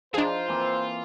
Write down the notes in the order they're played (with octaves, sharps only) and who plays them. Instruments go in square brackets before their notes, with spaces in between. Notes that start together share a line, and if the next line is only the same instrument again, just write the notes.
[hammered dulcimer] F3 D#4 [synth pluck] D4 G#4 [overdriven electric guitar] F4 [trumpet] C5
[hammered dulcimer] E3 A#3 C4